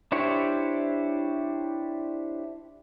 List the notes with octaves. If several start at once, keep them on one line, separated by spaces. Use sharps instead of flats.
D4 E4 G4 C5 C#5